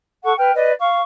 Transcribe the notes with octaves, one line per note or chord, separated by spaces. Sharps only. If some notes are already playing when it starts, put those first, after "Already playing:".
A4 F#5 C#6
B4 G5 F6
B4 D5 D#5
F5 C#6